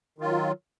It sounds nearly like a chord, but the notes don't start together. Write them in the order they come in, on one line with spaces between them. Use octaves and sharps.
D#3 F4 F#3